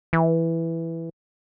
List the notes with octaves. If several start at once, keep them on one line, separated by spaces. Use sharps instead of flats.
E3